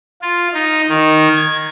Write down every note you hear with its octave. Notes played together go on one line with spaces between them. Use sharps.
F4
D#4
D#3
G#6